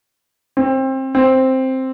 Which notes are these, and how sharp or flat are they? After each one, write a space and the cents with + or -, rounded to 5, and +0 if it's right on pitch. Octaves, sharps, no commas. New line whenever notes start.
C4 +25
C4 +5